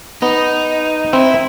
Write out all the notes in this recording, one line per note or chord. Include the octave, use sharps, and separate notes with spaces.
B3 D#4
C4 E4